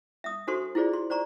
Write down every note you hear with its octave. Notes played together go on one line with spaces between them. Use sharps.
E5 D#6
D4 F#4 A4 C5 C6 C#6
E4 F4 G#4 C5 D5
C6
C5 D5 A#5 C#6